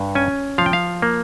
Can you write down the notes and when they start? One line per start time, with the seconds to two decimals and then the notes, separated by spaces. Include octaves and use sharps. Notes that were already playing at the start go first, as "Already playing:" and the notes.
Already playing: G2
0.15 C#4 G#5
0.58 F3 F5
0.66 G5
0.73 F5
1.02 A#3